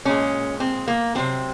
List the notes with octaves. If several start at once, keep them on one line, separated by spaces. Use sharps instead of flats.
A#2 G#3 C#4
C4
A#3
C3 F#3 C4